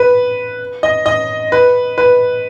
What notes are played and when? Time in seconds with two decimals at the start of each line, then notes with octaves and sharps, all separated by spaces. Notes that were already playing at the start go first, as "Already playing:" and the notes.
Already playing: B4
0.83 D#5
1.06 D#5
1.52 B4
1.98 B4